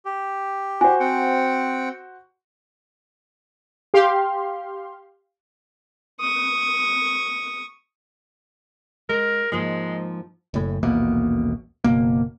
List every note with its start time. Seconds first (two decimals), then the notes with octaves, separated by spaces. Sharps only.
0.05 G4
0.81 F#4 C5 G#5
1.00 C4 F#5 G5
3.94 G4 F5 C6
6.20 C#6 D#6
9.09 G#3 A#4
9.52 G#2 F3 G#3 A#3
10.54 F#1 A2
10.83 D#1 A1 B2 A#3
11.84 F#1 B2 A#3